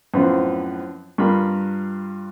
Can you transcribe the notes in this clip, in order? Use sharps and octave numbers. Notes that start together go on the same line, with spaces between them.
F#2 A2 F3 B3 C4 F4
G2 F4 A#4 B5